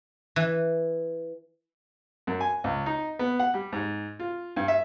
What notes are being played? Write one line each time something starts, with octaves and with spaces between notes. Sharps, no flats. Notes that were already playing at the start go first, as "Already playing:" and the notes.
E3
F#2
G#5
C#2
D#4
B3
F#5
G3
G#2
F4
G2
E5